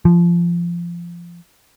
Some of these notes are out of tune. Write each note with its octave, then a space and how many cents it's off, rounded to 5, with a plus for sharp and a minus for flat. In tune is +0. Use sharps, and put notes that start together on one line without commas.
F3 -20